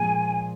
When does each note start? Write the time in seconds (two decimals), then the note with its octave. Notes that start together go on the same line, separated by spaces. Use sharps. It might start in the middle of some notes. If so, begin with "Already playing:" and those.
Already playing: A#2 F3 G#3 G#5